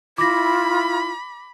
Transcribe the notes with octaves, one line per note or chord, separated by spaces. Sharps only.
E4 F4 B5 D6 A#6